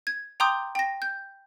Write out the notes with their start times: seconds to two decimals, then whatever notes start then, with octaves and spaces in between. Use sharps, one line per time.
0.07 G#6
0.40 G5 A#5 C6 D6 D#6 G6
0.75 G5 A#6
1.02 G6